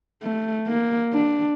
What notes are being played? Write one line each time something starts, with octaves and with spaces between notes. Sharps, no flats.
A3
A#3
D4